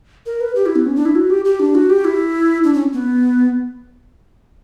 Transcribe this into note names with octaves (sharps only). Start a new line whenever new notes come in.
A#4
B4
G4
E4
B3
C#4
D4
E4
F#4
G4
G4
D4
F#4
G4
E4
D4
C#4
B3